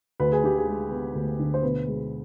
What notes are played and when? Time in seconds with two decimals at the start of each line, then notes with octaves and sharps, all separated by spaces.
0.20 D2 B4
0.32 G#4
0.44 D3 G4
0.57 G#4
0.67 G#3
0.91 B3
1.15 D2
1.39 D3
1.54 C5
1.63 B2 B4
1.87 G#3